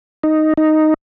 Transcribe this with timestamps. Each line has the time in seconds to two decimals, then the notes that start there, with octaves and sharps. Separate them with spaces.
0.23 D#4
0.57 D#4